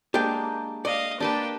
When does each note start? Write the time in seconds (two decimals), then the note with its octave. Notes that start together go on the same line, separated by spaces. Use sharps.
0.14 G#3 A#3 D4 G4 G5
0.85 D5 D#5 F5
1.20 A#3 D4 G4 B4 A5